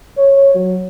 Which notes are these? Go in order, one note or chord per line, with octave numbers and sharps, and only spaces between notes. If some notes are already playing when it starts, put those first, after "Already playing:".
C#5
F#3